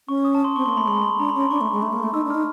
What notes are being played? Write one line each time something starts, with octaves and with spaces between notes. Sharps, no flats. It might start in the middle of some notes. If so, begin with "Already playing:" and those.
C#4 C#6
D#6
A5
C6
C4 C#6
A#3 C6
A3 B5
G#3 C6
B5
D4 A#5
B5
C#4
C6
D4 C#6
A3
G#3
A3
A#3
A3
D#4 E6
D4
D#4 F6